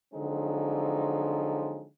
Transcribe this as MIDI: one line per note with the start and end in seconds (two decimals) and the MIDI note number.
0.14 1.86 50
0.14 1.86 53
0.14 1.86 54
0.14 1.86 56
0.14 1.86 60
0.14 1.86 63